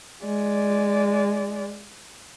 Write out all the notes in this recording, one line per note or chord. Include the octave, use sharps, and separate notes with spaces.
G#3 D5